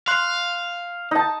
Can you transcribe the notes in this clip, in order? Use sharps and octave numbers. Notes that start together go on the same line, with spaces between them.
F5 C6 F#6
D#4 A5